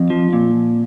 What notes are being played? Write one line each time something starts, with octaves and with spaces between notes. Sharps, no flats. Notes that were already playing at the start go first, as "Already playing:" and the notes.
Already playing: F2
F3
A#2